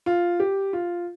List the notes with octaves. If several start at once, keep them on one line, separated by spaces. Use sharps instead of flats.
F4
G4
F4